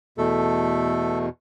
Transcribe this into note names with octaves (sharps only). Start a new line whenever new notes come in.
E2 B2 A3 A4